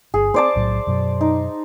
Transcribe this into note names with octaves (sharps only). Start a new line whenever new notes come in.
G1 G#4
B3 C4 C5 D5 A5
B1 A2 F#3
F#2 B2 F#3
D#4